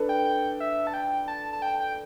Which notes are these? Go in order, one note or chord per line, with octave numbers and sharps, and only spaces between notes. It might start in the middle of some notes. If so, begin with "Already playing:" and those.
Already playing: D4 A4 B4
G5
G5
E5
A5
G5
A5
A5
G5
G5